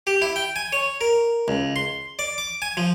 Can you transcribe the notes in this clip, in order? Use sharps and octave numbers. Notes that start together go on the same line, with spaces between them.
G4
E4
G5
G#5
C#5
A#4
C#2
C6
D5
D6
G#5
F3